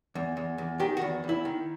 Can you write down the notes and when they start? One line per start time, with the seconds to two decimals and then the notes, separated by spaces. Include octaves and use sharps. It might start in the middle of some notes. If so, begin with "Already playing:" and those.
0.15 E2
0.37 E2
0.58 E2
0.79 D#3 G4
0.97 F#4
1.02 E2
1.24 E2
1.29 E4
1.45 D#3